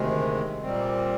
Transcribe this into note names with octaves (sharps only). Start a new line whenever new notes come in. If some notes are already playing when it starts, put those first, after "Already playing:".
Already playing: D2 C3 D#3 G#3
A#2 G3 C4